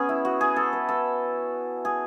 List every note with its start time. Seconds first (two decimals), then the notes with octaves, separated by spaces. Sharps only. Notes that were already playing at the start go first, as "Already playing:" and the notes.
Already playing: B3 C#4 G#4
0.09 E4
0.25 F#4
0.41 G#4
0.56 A4
0.73 B4
0.89 A4
1.85 G#4